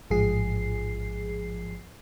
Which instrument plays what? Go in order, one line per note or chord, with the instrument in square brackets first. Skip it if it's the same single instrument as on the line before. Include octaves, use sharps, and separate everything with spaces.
[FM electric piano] A1 G#2 F3 G#4 C7